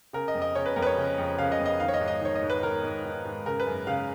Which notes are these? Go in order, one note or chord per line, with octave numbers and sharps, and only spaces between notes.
C#3 A#4
D#5
F2
D#5
C#3 C#5
B4
F2 A#4
B4
C#5
C#3
F2
C#3 F5
D#5
F2
D#5
D#3 F5
C#5
D#5
G#2
D#5
D#3 C#5
D#5
G#2
B4
D#3 A#4
G#2
D#3
G#2
C#3 A#4
B4
F#2
C#3 F5